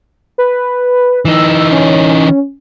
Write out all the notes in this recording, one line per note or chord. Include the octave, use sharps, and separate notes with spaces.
B4
E3 D#4 E6
C#4